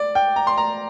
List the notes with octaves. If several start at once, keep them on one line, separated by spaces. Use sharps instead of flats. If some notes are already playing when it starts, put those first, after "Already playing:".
Already playing: D5
G5
A#5
C6
A#5